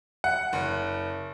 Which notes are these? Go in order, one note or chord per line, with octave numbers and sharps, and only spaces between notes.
F#5
F#1